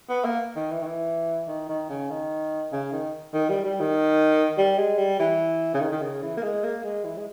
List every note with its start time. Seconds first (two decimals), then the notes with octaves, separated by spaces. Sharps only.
0.09 B3
0.24 A#3
0.56 D#3
0.71 E3
0.82 D#3
0.86 E3
1.48 D#3
1.69 D#3
1.89 C#3
2.10 D#3
2.72 C#3
2.92 D#3
3.34 D#3
3.50 G3
3.65 G3
3.80 D#3
4.58 G3
4.78 G#3
4.98 G3
5.19 E3
5.74 C#3
5.81 D#3
5.92 D#3
6.01 C#3
6.22 E3
6.37 A#3
6.42 G#3
6.64 A#3
6.84 G#3
7.04 E3
7.17 G#3